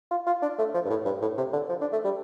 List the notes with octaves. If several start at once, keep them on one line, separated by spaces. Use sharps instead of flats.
F4
F4
D4
A3
F3
G2
A2
G2
A2
C3
D3
F3
D4
A3
G3